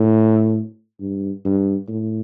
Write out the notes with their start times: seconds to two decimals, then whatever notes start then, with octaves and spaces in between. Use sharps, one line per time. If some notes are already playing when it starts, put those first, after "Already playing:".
Already playing: A2
1.00 G2
1.45 G2
1.88 A2